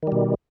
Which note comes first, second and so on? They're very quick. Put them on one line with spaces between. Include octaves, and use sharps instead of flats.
D#3 G3 B2